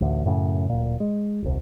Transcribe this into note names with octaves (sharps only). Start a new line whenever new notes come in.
A1 D2
F#2 A2 C#3
D1 A#2
G#3
D#1 C2